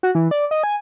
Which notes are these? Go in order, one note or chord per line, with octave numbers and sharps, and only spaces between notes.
F#4
E3
D5
D#5
G#5